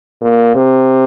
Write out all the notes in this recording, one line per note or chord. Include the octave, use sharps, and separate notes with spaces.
A#2
C3